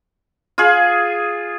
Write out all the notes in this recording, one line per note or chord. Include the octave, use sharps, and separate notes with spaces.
F4 G#4